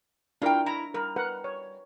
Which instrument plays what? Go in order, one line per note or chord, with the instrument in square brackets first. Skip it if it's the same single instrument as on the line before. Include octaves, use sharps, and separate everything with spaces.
[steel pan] D4 E4 A#4 [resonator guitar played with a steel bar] F4 G5
[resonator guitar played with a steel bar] E4 [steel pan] A#5
[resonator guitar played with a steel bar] G3 [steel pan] A#4
[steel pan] A#4 B4 F#5
C#5